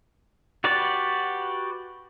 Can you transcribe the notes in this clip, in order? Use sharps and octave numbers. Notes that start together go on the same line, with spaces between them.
F#4 G4 B4 D5